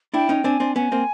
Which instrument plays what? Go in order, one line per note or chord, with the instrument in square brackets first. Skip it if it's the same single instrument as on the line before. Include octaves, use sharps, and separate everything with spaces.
[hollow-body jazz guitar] D4 E4 [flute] G5
[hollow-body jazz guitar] C#4 D#4
[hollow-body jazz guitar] C4 D4 [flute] G#5
[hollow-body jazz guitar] C4 D4
[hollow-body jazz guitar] B3 C#4 [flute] G#5
[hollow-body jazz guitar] A#3 C4